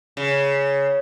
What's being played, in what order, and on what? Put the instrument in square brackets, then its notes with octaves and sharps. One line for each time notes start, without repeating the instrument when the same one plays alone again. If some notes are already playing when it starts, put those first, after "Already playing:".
[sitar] C#3